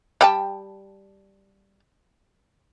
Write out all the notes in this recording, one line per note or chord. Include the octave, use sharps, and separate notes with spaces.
G3 G5 A5